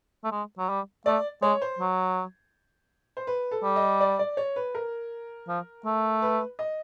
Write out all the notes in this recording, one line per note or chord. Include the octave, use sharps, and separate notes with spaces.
A3
G#3
F#3
G3
A3 D5
G#3 C#5
C5
F#3
C5
B4
A4
G3
D#5
D5
D5
C#5
B4
A#4
F3
A3
B4
D#5